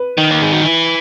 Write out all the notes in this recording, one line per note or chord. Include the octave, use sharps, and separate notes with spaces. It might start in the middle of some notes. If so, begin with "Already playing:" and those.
Already playing: B4
D#3
A#3
G#3
F#3
E3